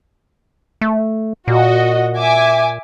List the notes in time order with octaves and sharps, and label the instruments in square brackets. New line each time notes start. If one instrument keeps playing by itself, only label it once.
[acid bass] A3
[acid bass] A#2 [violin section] F#4 D#5
[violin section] E5 G#5 D6